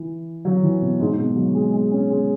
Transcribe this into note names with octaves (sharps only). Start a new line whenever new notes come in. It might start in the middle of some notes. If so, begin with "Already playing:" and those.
Already playing: E3
F#3
E3
B2
G#2
B2
F#3
G#3
G#3
C#4
G#3